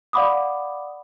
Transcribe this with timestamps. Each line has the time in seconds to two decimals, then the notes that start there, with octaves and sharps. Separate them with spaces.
0.13 D5 F5 F#5 B5 D6 D#6